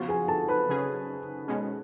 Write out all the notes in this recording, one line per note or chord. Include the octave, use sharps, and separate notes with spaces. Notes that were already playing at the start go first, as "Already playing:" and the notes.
Already playing: C#3 F3 B3 F4 F#4 F#5
G#4 G#5
A4 A5
B4 B5
C#3 F#3 C#4 G#4
B2 G#3 C#4